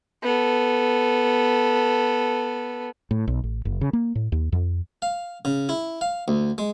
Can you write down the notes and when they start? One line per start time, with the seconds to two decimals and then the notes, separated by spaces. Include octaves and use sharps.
0.23 B3 A4
3.11 A2
3.27 B1
3.44 A1
3.65 F#1
3.81 C#3
3.93 A#3
4.15 A2
4.32 D#2
4.52 F2
5.02 F5
5.45 C#3
5.69 E4
6.01 F5
6.28 D2
6.58 G#3